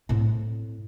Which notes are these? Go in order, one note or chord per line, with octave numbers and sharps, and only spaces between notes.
A2 C4